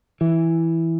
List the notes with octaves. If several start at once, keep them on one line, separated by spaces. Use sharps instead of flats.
E3